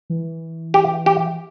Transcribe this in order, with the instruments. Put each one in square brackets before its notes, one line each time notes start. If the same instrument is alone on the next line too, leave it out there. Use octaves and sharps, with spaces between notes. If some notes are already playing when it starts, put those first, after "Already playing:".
[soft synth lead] E3
[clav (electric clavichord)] G4
G4